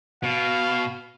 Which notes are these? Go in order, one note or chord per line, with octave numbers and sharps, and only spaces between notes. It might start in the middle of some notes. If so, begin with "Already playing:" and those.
B2 F5